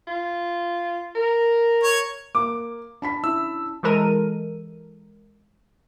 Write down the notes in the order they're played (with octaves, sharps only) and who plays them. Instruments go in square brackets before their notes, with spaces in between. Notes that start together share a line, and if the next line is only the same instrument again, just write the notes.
[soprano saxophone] F4
A#4
[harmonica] C#5
[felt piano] A#3 [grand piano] D6
[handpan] D4 [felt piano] A5 B5 B6
[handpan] C#4 E4 [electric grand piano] E6
[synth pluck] E3 G#3 A4 A#4 D#7